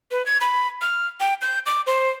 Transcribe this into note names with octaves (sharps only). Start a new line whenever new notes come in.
B4
G#6
B5
F6
G5
G6
D6
C5